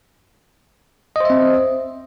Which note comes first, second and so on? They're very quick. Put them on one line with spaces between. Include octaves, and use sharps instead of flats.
D#5 C5 E5 C4